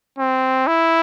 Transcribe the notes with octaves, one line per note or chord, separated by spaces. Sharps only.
C4
E4